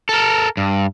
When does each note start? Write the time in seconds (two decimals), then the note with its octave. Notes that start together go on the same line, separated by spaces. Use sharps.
0.09 A4 A#4
0.57 G2